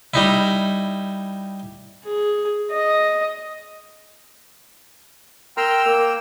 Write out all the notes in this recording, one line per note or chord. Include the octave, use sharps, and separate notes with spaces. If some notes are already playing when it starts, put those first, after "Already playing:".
G3 D#4 E4
G#4
D#5
A#4 G5 A#5 C6 E6 F6
A#3 A#4